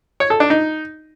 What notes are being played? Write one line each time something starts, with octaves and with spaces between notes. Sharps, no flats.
C#5
A4
D4
D#4